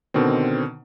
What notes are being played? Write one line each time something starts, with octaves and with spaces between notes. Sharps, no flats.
B2 D3 D#3 C4